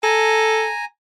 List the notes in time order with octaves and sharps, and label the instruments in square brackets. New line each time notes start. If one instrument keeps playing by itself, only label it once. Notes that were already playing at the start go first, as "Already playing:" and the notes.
[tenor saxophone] A4 [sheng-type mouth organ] G#5 A#5